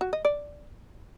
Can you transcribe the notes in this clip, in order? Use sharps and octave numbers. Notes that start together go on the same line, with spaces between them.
F#4
D#5
D5